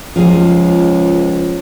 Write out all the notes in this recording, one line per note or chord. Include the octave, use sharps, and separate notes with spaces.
C#2 F3 G#4